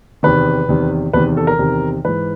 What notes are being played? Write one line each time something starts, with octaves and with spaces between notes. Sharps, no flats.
E2 C3 D#3 B4
E2 C3 D#3
E2 C3 D#3 B4
A4
A#4
E2 C3 D#3
G#2 E3 B4